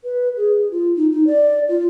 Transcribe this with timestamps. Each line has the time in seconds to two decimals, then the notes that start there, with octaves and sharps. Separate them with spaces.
0.04 B4
0.37 G#4
0.71 F4
0.96 D#4
1.11 D#4
1.27 D5
1.68 F4